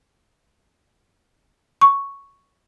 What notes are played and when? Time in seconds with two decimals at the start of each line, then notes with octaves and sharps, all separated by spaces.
1.81 C#6